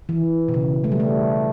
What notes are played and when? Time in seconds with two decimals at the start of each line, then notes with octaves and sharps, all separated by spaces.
0.09 E3
0.48 B2
0.54 C#3
0.84 A3
0.92 G3
1.00 A3